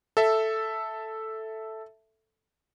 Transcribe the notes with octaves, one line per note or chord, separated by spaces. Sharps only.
A4 E5